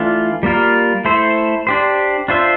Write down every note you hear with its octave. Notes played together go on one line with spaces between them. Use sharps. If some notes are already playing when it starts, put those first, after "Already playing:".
Already playing: E3 A3 D4 F4
G3 A#3 F4 A#4
A3 E4 A4 C5
D4 G4 C5
D4 F4 C5 E5